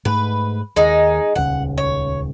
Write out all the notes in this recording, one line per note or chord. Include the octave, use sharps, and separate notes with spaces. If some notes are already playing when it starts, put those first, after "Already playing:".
G#2 A3 B4
D#2 G#3 D#4
D#1 C#2 C#3 F#5
C#5